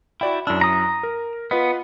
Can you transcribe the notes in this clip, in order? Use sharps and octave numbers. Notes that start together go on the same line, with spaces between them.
E4 F#4 D5 G5
F#2 D4 E4 E6
A#5 D#6
A#4
B3 F4 B4 D#5